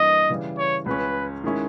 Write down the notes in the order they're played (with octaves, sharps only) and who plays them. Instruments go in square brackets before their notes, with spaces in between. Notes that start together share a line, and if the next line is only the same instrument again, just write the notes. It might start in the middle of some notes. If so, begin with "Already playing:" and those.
Already playing: [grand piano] G2 E3 A#3 [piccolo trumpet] D#5
[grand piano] C#3 E3 G3
[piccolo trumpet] C#5
[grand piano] C#2 C#3 G#3 C#4 [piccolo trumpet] B4
[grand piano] D#3 G#3 C#4 E4